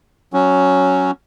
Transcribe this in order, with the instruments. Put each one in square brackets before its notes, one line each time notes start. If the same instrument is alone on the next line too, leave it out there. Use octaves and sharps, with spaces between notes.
[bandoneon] F#3 C#4